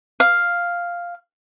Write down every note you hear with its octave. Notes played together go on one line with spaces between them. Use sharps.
F5